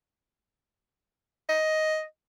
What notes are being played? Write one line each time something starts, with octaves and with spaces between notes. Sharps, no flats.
D#5